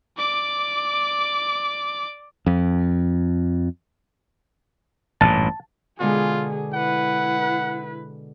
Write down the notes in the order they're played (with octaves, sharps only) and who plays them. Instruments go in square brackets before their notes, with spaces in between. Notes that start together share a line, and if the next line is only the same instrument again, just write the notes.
[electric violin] D5 D6
[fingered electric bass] F2
[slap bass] A1 G2 A#2 [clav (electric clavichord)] A5
[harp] B2 D3 G#3 [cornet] F4 [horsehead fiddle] G#4
[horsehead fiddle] E4 B4 [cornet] F#5